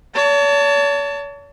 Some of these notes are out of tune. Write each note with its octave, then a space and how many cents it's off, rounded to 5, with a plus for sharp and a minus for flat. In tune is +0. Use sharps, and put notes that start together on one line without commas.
C#5 +45 A5 +25